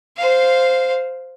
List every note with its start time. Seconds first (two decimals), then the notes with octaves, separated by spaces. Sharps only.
0.17 C5 F5